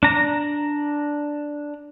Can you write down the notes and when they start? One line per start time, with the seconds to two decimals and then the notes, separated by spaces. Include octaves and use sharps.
0.03 D4 A#5